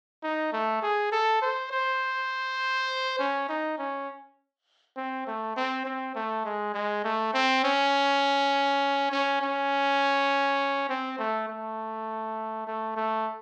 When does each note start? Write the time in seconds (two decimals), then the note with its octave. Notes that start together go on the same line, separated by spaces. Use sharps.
0.23 D#4
0.53 A3
0.82 G#4
1.12 A4
1.42 C5
1.71 C5
3.19 C#4
3.49 D#4
3.78 C#4
4.97 C4
5.27 A3
5.56 C4
5.85 C4
6.15 A3
6.45 G#3
6.74 G#3
7.04 A3
7.34 C4
7.64 C#4
9.12 C#4
9.41 C#4
10.89 C4
11.19 A3
11.48 A3
12.67 A3
12.96 A3